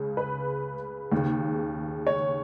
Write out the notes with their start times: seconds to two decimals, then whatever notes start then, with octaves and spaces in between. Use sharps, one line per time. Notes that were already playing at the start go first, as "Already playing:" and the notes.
Already playing: C#2 C#3
0.17 B4
1.12 D#2
1.17 C#3
2.07 C#5